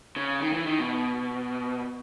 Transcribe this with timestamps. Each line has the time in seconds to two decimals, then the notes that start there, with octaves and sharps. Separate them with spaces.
0.16 C#3
0.42 D#3
0.53 E3
0.67 D#3
0.79 B2